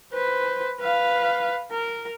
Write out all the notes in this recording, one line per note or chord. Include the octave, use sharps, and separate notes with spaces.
B4 C5
B4 F5
A#4